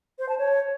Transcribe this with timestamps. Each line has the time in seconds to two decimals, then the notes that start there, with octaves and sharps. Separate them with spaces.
0.19 C5
0.29 A5
0.38 C#5